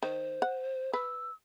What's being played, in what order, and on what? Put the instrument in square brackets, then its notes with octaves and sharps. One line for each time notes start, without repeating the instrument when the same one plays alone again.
[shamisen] D#3 [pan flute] C5
[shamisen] F#5
[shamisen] B4 [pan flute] E6